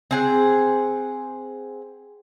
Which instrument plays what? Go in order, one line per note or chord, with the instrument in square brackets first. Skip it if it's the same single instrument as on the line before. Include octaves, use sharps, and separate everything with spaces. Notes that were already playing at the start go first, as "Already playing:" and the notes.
[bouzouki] C4 G#4 F#5